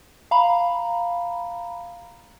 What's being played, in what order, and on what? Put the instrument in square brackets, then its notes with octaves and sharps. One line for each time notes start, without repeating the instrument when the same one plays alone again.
[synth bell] F5 A#5 B5